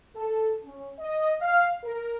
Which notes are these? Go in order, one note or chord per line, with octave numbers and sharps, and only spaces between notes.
A4
C#4
D#5
F5
A#4